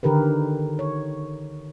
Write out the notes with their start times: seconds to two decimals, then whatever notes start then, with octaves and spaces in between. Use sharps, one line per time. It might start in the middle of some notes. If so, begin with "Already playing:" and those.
0.03 D3 D#3 G4 A#4 B4
0.79 C#5